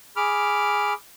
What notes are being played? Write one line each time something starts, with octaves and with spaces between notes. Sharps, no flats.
G#4 B5 D6 F6